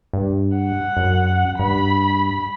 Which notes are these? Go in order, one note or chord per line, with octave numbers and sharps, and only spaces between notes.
G2
F#5
F#2
G2 B5